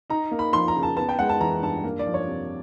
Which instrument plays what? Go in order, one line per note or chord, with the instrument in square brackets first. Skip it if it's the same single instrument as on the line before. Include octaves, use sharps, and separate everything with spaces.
[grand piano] D#4 A#5
A#3
B5
F3 C6
A#5
C#3
A5
B3 A5
G5
G#3 F#5
A5
E3 A#5
G2 A5
A#3
D5
F3
C#5
C3